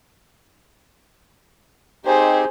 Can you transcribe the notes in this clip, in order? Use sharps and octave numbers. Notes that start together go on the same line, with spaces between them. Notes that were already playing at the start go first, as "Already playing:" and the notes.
C4 D#4 G4 G#4 C5